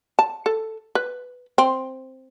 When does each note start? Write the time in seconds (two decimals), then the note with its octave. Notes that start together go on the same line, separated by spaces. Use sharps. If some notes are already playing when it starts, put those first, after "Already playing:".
0.19 A5
0.46 A4
0.95 B4
1.58 C4